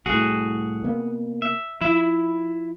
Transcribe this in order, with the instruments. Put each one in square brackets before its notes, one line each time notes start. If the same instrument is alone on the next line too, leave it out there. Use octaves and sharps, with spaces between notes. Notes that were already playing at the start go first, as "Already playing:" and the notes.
[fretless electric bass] C2 A2 [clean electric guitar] F#4 G#4
[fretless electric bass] C3 A#3 B3
[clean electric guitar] E5
[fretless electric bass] F3 [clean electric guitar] E4 E5